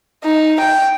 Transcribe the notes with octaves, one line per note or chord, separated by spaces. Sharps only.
D#4
G5